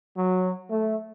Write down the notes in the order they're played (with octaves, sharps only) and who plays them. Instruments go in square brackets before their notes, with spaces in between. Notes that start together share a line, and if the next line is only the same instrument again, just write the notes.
[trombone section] F#3
A3